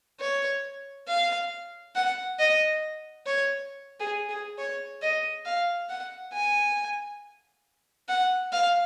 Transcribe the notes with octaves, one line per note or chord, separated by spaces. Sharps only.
C#5
F5
F#5
D#5
C#5
G#4
G#4
C#5
D#5
F5
F#5
G#5
F#5
F5